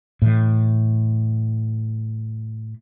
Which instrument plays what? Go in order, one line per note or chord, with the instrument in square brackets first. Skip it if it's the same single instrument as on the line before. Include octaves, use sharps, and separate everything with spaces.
[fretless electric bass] A2 E3